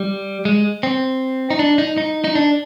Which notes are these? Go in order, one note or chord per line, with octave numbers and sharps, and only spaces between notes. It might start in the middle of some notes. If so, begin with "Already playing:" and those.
Already playing: G3
G#3
C4
D#4
D4
D#4
D#4
D#4
D4